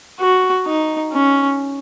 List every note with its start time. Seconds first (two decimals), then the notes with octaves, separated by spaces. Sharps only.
0.20 F#4
0.66 D#4
1.12 C#4